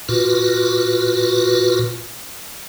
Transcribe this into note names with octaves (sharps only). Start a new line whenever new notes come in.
A#2 F4 F#4 B4